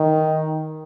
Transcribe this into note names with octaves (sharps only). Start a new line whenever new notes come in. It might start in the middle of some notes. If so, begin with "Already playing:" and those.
Already playing: D#3